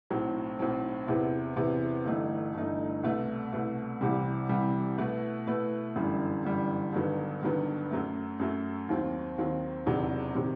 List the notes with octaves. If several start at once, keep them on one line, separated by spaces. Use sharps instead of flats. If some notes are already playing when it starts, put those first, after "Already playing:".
B1 A2 F#3 C4
B1 A2 F#3 C4
E2 C3 E3 B3 E4
E2 C3 E3 B3 E4
G1 G2 E3 A3 D#4
G1 G2 E3 A3 D#4
C2 B2 A3
C2 B2 A3
C2 C3 E3 G3
C2 C3 E3 G3
B2 A3 E4 B4
B2 A3 E4 B4
G1 F#2 E3 G3
G1 F#2 E3 G3
G1 G2 D#3 F#3 B3
G1 G2 D#3 F#3 B3
F#2 F#3 A3
F#2 F#3 A3
D#2 D#3 F#3 C4
D#2 D#3 F#3 C4
E1 E2 C3 D#3 F#3
C3 D#3 F#3